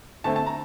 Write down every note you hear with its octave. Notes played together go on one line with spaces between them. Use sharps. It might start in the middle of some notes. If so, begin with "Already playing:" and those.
D3 A3 C4 A5
A5
A#5